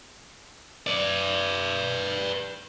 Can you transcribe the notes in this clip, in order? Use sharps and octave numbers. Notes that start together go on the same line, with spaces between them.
B4 D5